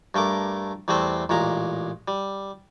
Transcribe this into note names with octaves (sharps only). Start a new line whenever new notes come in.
G2 A3 A#4 D6
E2 G3 A3 C4 C5
A1 A#2 G#3 A#5
G3